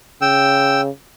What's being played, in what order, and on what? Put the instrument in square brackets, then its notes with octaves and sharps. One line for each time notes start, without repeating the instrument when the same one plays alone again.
[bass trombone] C#3 [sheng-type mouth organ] G5 E6